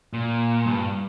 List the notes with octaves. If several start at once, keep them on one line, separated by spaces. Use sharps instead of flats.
A#2
G2